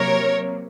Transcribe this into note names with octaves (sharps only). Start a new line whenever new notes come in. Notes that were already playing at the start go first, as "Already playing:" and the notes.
Already playing: C3 F#3 A#3 A#4 C#5